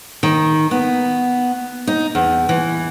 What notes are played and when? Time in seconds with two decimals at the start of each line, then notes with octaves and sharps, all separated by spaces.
0.23 D#3
0.71 B3
1.87 D#4
2.15 E2
2.49 E3